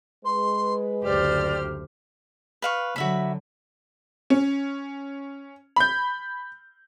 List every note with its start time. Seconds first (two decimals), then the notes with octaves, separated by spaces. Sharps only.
0.24 G#3 B4 C6
1.04 F#1 D2 G4 C5 D5 F6
2.62 B4 F5 C#6
2.96 D3 F#3 F#4 E5 B5
4.30 C#4
5.76 B5 G6